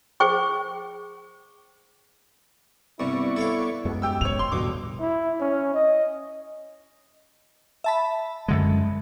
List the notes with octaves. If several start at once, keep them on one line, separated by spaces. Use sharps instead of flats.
G#4 C5 G5 C#6
C2 G2 B3 E4 D5 C#6
A4 C#5 F5
F#2 G#3 B3
G4 G5 E6
A2 C#5 F7
C6
E2 G2 B2 D3 D6
E4
C#4
D#5
E5 A5 B5
F#2 D3 G#3